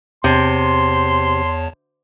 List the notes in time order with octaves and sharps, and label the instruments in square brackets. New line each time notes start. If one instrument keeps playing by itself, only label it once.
[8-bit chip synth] E2 C#5 A5 [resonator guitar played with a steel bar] C3 [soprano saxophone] C6